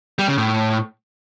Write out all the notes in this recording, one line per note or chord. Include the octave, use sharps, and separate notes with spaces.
G3
C#3
A2